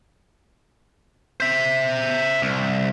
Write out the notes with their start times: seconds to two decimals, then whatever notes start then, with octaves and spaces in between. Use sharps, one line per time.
1.40 C5 E5
2.42 C2